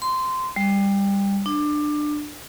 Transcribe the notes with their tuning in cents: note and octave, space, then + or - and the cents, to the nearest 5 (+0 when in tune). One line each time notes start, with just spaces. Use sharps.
C6 -15
G3 +20
D4 +20